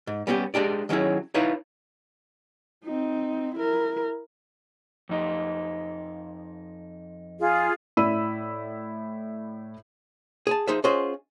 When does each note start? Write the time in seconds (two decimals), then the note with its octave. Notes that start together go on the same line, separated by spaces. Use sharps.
0.07 G#2
0.27 G3 B3 C#4 F#4 G4
0.54 G#3 D4 G4 D5
0.89 D#3 F#3 C#4 E4 G#4
1.34 D#4 E4 B4 C#5 F5
2.84 C4 D#4
3.55 E4 A#4
5.09 F2 D#4
7.39 F4 G#4
7.97 A2 E4 D5 B5 E6 D#7
10.47 G#4 G#5 A5
10.67 F3 D#4 G#4 C5 E5
10.84 C#4 F4 G#4 C5 D#5 F#5